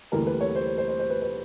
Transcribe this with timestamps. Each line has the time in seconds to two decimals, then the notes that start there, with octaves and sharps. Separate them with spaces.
0.12 D2 C3 E3 G3 A#3 A#4
0.27 B4
0.41 C#5
0.56 C5
0.78 C5
0.88 C5
0.99 C5
1.10 B4
1.22 B4